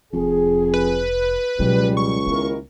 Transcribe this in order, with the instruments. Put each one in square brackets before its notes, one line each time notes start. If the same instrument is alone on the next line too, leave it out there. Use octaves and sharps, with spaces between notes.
[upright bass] F1 [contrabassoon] F2 [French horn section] G#4
[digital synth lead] B4
[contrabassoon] C#2 [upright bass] B2 F#3 [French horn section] G3
[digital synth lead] C#6
[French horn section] D#2 E4 A#4 [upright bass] B3